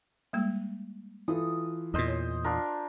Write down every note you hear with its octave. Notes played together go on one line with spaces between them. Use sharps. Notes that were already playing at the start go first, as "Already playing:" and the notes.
G3 G#3 A#3
E3 F4 A4 D#6
E2 A#2 C5 D#5
C#5
D4 F4 A#4